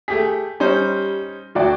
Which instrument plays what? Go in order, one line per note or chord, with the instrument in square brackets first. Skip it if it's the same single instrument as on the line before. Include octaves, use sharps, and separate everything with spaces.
[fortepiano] A3 G4 G#4 [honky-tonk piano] B6
[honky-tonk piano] G3 [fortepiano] C#4 D#4 C5
[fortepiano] D2 [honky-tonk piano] F#4 D5 G5